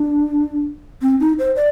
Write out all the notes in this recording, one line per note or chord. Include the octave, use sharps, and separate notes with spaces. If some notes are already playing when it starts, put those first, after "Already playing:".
Already playing: D4
C4
D#4
C5
D5